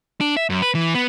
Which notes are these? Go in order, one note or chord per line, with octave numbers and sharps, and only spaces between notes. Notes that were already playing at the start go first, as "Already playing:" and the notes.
D4
E5
F#2
B4
E3
B3